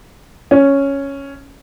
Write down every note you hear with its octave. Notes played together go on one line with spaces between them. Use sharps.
C#4